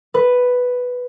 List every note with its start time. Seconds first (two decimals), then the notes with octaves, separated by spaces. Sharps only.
0.14 B4